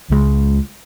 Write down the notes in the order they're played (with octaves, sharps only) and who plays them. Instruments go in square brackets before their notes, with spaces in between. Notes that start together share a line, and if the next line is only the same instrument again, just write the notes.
[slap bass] C#2 C#3 G#3